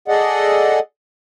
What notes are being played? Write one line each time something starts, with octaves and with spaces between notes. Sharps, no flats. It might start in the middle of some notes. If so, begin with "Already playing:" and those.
G#4 A4 D5 D#5 F#5